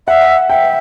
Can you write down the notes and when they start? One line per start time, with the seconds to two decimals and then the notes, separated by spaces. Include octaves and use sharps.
0.07 E5 F#5
0.50 E5 G5